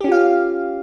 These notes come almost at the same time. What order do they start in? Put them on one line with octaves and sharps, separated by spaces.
G4 C#4 F4 F5